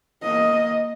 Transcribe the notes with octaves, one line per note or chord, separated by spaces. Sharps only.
A#3 D#5